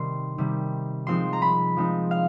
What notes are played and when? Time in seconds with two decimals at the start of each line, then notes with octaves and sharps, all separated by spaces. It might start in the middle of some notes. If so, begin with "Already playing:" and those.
Already playing: C3 D#3 G3 C6
0.38 C3 D#3 G3
1.07 F3 G#3 C4 D#4 C6
1.33 A#5
1.42 B5
1.77 F3 G#3 C4 D#4
2.11 F5